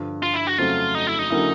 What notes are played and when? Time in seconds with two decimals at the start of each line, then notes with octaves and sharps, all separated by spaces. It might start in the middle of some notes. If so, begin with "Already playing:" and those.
Already playing: G2 D3 F3
0.23 F4
0.34 E4
0.47 F#4
0.58 F2 C#3 F#3 A3 C4 F4
0.95 D#4
1.07 E4
1.19 D#4
1.30 D3 F#3 A#3 C#4 E4